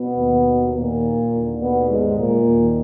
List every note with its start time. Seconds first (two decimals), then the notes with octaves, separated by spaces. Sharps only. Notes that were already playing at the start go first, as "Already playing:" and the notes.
Already playing: B2 B3
0.18 D#2 D#3
0.75 A#2 A#3
1.32 D#2 D3
1.61 B2 B3
1.89 G#2 G#3
2.18 A#2 A#3
2.46 D#2 D#3